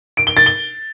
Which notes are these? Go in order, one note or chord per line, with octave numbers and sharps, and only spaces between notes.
D7
G7
A6
G7